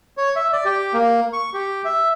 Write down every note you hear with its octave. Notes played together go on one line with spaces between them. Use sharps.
C#5
E5
D5
G4
A#3
C#6
G4
E5